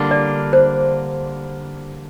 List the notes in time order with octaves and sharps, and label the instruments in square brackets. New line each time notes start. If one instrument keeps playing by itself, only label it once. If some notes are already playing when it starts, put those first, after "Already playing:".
Already playing: [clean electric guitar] D3 G3 A#3 D4 F4
[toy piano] D5
C5